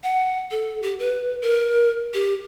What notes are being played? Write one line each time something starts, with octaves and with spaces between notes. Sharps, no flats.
F#5
A4
G4
B4
A#4
G4